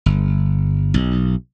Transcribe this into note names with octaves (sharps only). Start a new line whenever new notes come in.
G1
B1